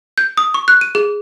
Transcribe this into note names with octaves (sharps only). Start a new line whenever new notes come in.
G6
D#6
C#6
F#6
D#7
G#4